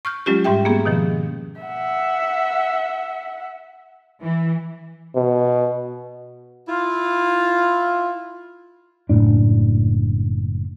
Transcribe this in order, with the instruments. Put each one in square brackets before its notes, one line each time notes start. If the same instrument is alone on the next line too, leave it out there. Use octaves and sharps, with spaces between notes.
[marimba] C#6 F6 G6
F#3 G#3 C#4 F4 G4
G#2 G3 G4 E5 G5
A#3 B3 C#4 G#4
B2 D#3 F3
[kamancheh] E5 F#5
[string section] E3
[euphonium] B2
[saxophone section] E4 F4
[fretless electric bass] F#1 B1 A2 D4